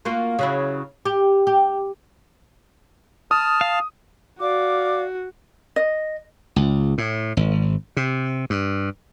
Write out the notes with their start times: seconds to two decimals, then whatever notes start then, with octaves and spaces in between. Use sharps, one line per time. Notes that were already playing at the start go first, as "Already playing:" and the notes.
0.05 A#3 F4 F#4
0.39 C#3 F#3 E4
1.06 G4
1.47 G4
3.31 A5 D#6 F6
3.61 F5
4.40 F#4 D5 F5 D6
5.76 D#5
6.56 C#2
6.98 A2
7.37 G#1
7.97 C3
8.50 G2